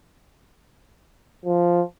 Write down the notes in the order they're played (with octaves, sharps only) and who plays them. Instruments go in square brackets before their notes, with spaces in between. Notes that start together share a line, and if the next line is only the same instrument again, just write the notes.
[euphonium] F3